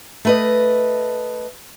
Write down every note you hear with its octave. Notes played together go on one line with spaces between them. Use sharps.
A3 B4 D#5